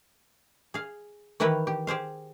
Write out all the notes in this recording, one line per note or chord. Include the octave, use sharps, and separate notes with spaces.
G#4 F5
D#3 E3 E4 G4 B4 C#5
G4
G4 G#4 C5 F5